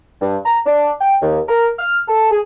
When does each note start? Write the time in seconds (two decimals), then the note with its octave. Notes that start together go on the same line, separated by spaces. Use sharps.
0.21 G2
0.45 A#5
0.66 D4
1.01 G5
1.22 D#2
1.48 A#4
1.79 F6
2.08 A4
2.31 G#4